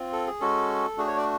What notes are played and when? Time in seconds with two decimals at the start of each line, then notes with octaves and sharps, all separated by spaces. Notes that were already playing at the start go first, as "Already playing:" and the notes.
Already playing: C4 F4
0.13 A4
0.27 G#4
0.41 G#3 C#4 F#4 A4
0.97 A3 D4 F#4 G#4
1.07 C#5
1.17 D5